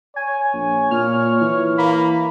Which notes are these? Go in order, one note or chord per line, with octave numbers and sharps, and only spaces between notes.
C#5 G#5
A#1
A#2 F6
E3
A#3 B5